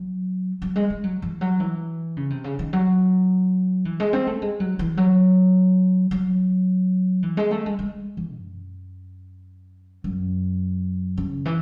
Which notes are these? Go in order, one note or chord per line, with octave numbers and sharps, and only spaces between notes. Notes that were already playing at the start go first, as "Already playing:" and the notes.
Already playing: F#3
F#3
G#3
G#3
F#3
E3
F#3
E3
C#3
C3
C#3
D#3
F#3
E3
G#3
C4
A3
G#3
F#3
E3
F#3
F#3
E3
G#3
A3
G#3
G#3
E3
F#2
F#2
C#3
E3